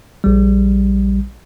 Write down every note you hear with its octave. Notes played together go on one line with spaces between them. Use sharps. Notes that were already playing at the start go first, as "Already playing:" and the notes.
A#1 G3